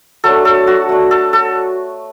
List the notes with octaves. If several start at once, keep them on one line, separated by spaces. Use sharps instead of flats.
F#3 A3 D4 A4
A4
F#4
A3 D4
A4
A4